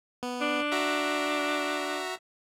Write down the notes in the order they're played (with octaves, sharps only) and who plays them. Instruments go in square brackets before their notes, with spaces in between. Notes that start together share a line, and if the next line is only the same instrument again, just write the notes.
[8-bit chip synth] B3
[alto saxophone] D4
[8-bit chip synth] F#4 E5 A#5